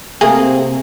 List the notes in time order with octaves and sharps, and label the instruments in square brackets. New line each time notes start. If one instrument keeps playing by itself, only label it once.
[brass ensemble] C3 C4 [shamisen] A3 A#3 G#4